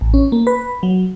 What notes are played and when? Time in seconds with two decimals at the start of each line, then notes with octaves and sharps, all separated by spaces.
0.01 A1
0.14 C#4
0.32 A#3
0.47 B4
0.83 F#3